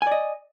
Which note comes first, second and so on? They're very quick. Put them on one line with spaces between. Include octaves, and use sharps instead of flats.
G#5 D5 D#5